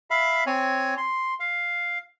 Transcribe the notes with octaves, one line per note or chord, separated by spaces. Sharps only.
E5 F5 B5
C4 C#5 G#5
C6
F5